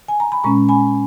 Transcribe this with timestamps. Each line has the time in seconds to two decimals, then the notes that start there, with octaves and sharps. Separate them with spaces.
0.08 G#5
0.20 A#5
0.32 B5
0.43 A#2 G#3 C#4 A#5 C#6
0.69 G#5 B5